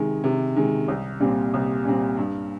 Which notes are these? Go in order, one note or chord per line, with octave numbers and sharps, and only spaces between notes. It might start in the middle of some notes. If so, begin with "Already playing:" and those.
Already playing: C3 D#3 G#3
C3
D#3 G#3
C2
A#2 G3 C4
C2
A#2 G3 C4
G2